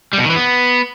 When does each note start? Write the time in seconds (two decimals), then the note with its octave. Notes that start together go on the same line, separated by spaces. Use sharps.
0.13 G3
0.19 B2
0.24 D#3
0.30 E3
0.36 B3